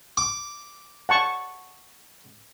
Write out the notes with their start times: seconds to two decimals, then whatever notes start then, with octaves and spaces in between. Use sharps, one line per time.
0.17 D6
1.09 F#5 A5 C#6